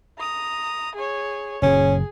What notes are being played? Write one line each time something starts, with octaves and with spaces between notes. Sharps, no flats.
A#5 D#6
G#4 C#5
F#1 A#2 C#4 G#4